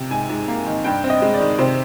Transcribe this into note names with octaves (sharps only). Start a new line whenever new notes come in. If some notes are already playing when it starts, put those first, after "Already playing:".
Already playing: C3
G#2 G#5
G#2
A#3
D#3
G2 G5
C4
D#5
G#3
D5
D#3
C3 C5